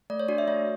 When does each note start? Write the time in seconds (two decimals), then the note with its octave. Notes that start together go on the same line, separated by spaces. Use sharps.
0.10 A3 D5
0.20 C#5
0.28 D4 F#4 D5
0.38 E5
0.48 A3 C#5